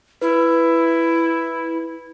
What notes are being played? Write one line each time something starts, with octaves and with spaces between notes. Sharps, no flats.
E4 B4